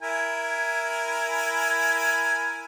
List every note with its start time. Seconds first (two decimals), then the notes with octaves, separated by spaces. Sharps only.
0.02 E4 A#4 G#5